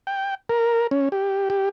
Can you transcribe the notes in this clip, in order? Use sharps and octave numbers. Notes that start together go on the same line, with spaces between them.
G5
A#4
C#4
G4
G4